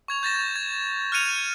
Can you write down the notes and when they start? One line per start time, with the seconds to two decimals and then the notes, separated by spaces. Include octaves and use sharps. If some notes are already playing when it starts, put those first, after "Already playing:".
0.08 C#6 G#6 F7
0.23 G6 A6 A#6 E7
0.56 G#6
1.12 F6 F#6 G#6 C#7 D#7 F7